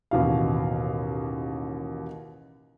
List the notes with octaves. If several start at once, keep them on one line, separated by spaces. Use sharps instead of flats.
A1 D#2 B2 F5